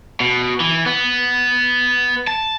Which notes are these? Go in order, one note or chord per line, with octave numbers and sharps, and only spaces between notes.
B2
E3
B3
A5